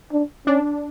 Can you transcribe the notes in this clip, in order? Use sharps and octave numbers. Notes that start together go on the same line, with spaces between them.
D4
C#4 D4